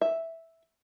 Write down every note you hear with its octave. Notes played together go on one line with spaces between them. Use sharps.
E5